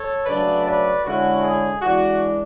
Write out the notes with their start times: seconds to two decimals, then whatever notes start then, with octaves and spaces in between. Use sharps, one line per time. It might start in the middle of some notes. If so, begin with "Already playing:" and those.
Already playing: A4 C#5
0.26 C#3 F#3 A3 D4 B4 D5
0.66 B4 D5
1.05 D3 G#3 C#4 E4 F#4
1.43 G#4
1.82 E3 G#3 D4 F#4